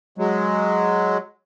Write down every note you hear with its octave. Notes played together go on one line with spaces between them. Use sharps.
F#3 G#3